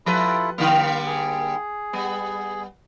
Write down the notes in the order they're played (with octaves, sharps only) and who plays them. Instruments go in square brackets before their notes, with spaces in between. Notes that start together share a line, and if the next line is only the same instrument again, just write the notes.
[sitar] F3 B4 [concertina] E4 F4 A4
[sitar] D3 G3 A#3 [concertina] F5
[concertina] G#4
[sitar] G3 B3